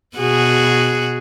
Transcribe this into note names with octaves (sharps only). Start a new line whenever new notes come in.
B2 F#4 G#4